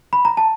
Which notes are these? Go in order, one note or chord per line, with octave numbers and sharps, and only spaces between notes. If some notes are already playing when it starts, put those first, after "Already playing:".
B5
A#5
A5